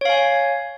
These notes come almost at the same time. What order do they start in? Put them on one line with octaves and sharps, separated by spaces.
C#5 F5 G#5